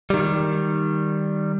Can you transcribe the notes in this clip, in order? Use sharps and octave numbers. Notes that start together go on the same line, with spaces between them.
D#3 G3